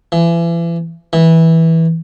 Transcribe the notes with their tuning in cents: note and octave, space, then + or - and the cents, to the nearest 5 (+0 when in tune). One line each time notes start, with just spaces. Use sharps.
E3 +35
E3 -15